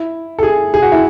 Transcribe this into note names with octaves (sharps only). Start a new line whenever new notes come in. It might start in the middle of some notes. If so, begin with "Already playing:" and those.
Already playing: E4
A4
G#4
G#4
F#4
E4